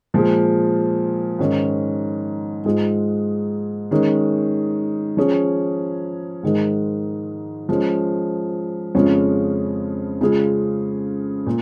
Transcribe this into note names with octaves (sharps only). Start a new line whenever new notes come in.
A#2 F3 G#3 F4 G#4
G#2 D#3 C#4
G#2 G#3 F4 G#4
D#3 G#3 C#4
F3 C#4 G#4
G#2 D#3 G#3
F3 G#3 C#4
F2 C#3 G#3 C#4 F4
C#3 G#3 F4 G#4
A#2